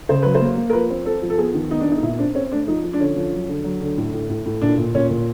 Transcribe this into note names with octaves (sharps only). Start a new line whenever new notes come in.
C#3 C5
F#3 B4
C5
A#3
A#3
A#4
F3 B4
C4
C4 A4
F3
A4
B3 G#4
D#3
B3 D#4
D4
B3 D#4
D#4
A#2 E4
C4 D4
C4 C#4
A3 D4
F3 D#4
F3
D4
D3 C#4
F3
F#3
D3
F#3
D3
A2
A2
A2
A2
A#2 D4
A#2
A#2 C#4
A#2